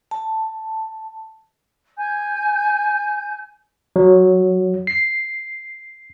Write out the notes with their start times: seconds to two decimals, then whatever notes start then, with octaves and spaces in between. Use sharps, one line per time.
0.11 A5
1.96 G#5 G6
3.96 F#3
4.87 C7